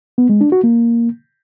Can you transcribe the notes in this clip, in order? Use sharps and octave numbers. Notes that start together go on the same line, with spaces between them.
B3
G#3
D4
F#4
A#3